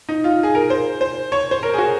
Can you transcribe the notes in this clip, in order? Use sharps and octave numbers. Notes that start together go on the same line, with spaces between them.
D#4
F4
G#4
A#4
C5
C5
C#5
C5
A#4
G#4
F#4